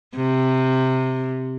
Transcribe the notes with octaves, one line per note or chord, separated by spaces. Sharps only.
C3